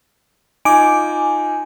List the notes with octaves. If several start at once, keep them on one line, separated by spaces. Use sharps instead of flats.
D#4 F4 G#5 D6 D7